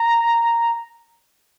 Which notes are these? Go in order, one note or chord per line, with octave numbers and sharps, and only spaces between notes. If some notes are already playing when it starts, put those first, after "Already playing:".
Already playing: A#5